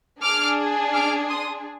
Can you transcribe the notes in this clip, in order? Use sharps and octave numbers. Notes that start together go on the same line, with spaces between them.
D4 G#4 D6 F6
D6 F6
C6 D#6